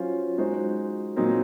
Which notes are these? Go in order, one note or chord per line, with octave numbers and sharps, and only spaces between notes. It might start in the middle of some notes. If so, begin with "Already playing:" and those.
Already playing: F#3 C#4 F4 C5
G#3 D#4 F#4 C5
A#2 F#3 C4 D#4 A#4